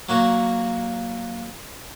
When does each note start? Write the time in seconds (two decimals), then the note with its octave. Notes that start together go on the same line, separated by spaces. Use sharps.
0.09 F#3 A#3 F#4